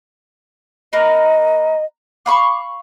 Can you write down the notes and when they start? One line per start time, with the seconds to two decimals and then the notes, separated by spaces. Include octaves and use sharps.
0.93 A#3 A#4 B4 D#5
2.26 F5 B5 C#6 D6